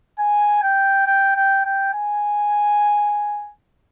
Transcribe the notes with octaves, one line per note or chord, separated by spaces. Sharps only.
G#5
G5
G5
G5
G5
G#5